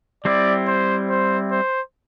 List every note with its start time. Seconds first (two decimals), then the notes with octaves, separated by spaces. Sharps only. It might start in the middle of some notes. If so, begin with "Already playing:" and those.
0.24 G3 C4 E4 D5
0.67 C5
1.09 C5
1.52 C5